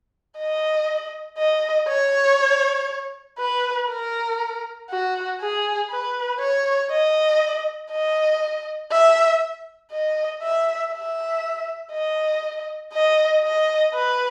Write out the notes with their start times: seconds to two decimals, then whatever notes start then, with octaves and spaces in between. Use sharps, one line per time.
0.38 D#5
1.38 D#5
1.88 C#5
3.39 B4
3.89 A#4
4.90 F#4
5.40 G#4
5.90 B4
6.40 C#5
6.91 D#5
7.91 D#5
8.91 E5
9.92 D#5
10.43 E5
10.93 E5
11.92 D#5
12.94 D#5
13.43 D#5
13.94 B4